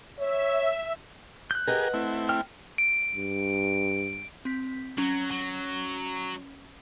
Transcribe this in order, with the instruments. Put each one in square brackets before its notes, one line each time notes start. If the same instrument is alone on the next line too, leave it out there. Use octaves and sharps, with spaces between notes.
[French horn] C#5 [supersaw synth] E5
[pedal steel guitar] F#6 G6
[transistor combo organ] G4 G#4 A#4 [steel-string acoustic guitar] B4 D#5 F#5
[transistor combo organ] A3 C4 E4
[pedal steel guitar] G5 F6
[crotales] D7
[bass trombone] G2
[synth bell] C4 B6
[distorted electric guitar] F#3 [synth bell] C#4
[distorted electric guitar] F#3